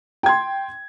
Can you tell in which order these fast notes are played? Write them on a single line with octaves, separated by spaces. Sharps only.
G5 G#6 C6